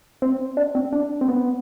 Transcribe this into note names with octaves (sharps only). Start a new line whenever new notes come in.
C4
D4
C4
D4
C4
B3